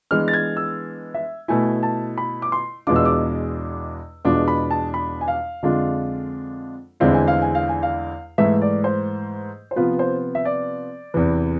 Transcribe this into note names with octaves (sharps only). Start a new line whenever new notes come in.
E3 G#3 B3 D4 F6
A6
G#6
E6
E5
B2 A3 E4 G#5
A5
B5
D6
C6
E2 B2 G#3 D4 F4 D6
E6
D6
E2 B2 G#3 D4 F4 D6
B5
A5
B5
G#5
F5
F2 D3 G#3 D4 F4
E2 D3 G#3 C4 E4 F5
G#5
F5
G#5
F5
G#5
F5
G#2 E3 A3 E5
D5
C5
C5
C3 F3 B3 F4 B4
C5
E5
D5
E2 C3 E3